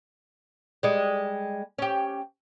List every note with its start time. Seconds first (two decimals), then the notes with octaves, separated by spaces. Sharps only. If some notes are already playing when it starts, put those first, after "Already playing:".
0.83 G3 G#3
1.78 C#4 G4